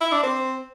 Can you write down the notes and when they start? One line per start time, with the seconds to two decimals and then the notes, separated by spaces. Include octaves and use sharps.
0.01 E4
0.12 D4
0.23 C4